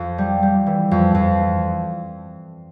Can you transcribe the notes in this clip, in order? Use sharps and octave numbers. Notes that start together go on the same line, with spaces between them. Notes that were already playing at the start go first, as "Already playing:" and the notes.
Already playing: F2
G3
G3
E3
F2
F2